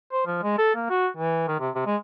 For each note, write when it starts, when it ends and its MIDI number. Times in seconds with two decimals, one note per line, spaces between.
0.12 0.24 72
0.26 0.38 53
0.43 0.58 56
0.58 0.74 69
0.75 0.85 58
0.90 1.08 66
1.17 1.44 52
1.48 1.55 51
1.60 1.70 48
1.75 1.83 48
1.86 1.96 56